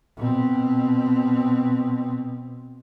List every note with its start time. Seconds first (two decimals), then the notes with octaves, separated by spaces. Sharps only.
0.17 B2 C4